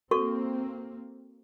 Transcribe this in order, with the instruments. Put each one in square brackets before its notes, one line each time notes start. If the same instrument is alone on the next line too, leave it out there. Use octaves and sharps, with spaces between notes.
[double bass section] A#3 C4 [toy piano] F#4 A4 C#6